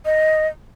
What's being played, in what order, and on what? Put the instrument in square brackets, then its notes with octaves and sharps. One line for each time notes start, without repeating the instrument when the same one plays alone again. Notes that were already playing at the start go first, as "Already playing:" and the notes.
[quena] D#5